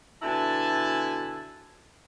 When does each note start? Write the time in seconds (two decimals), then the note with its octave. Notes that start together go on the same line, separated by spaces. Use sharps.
0.22 B2 D3 E4 G#5 A5